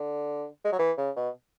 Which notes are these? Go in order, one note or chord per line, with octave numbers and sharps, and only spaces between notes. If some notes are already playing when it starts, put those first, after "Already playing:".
Already playing: D3
G#3
F#3
E3
C#3
B2